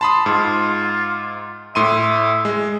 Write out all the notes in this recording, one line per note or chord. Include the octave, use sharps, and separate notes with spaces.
A5 B5 C6 D#6
G#2 F4
A2 E5 C6 D#7
G#3